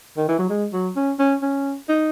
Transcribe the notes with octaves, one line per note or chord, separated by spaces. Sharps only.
D#3
E3
F#3
G#3
F#3
C#4
C#4
C#4
D#4